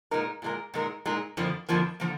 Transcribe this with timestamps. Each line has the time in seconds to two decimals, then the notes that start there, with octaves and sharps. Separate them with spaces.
0.11 A#2 G#3 D#4 A#4
0.42 A#2 G#3 D#4 A#4
0.74 A#2 G#3 D#4 A#4
1.05 A#2 G#3 D#4 A#4
1.37 F2 D3 F3 A#3
1.69 F2 D3 F3 A#3
2.00 D3 F3 A#3